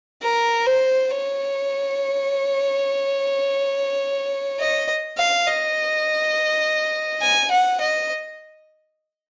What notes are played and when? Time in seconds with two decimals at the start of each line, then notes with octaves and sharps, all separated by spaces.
0.22 A#4
0.66 C5
1.10 C#5
4.60 D#5
5.17 F5
5.47 D#5
7.22 G#5
7.51 F#5
7.81 D#5